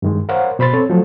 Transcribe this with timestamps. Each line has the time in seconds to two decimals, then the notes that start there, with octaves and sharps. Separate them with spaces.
0.02 G2 D#3 G#3
0.29 A#4 C5 C#5 F5 F#5
0.59 B2 C5 B5 C6 A6
0.73 C4 A4 C#5
0.89 F3 F#3 A3 A4